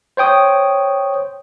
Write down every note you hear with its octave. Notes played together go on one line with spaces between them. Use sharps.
C5 C#5 G5 D#6